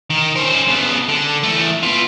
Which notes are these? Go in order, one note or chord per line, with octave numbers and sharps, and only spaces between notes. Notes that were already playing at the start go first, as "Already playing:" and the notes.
D#3
C#4 C5
C#3 B3
D3
E2 A3
B3 F4